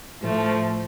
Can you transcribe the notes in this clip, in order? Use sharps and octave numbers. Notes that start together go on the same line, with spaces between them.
A2 F3 A3